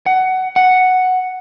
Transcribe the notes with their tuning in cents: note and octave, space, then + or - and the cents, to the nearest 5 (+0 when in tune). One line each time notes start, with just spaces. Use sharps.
F#5 +15
F#5 +0